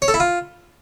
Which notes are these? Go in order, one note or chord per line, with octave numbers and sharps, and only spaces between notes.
C#5
A4
E4
F4